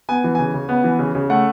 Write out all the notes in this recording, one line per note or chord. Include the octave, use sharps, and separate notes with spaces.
B3 G#5
E3
C#3 G#5
C#3
B3
E3
C#3
C#3
A3 F#5